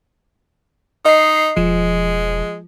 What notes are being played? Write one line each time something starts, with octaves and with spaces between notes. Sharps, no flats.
D#4 D#5 C7
E1 F3 G#3